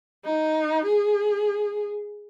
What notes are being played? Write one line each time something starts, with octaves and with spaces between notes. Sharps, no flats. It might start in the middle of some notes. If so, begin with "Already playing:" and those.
D#4
G#4